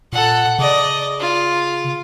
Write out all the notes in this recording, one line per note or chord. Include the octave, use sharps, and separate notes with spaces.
A#2 A4 F#5
C#3 D5 D#5
F4